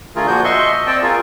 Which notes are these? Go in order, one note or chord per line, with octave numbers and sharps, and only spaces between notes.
D3 A3 F4 G#4 A#4
A#2 F3 A#3 F#4 G6
D#5 E5 C6 C#6
C4 D5 G5 A5
F4 G#4 A#4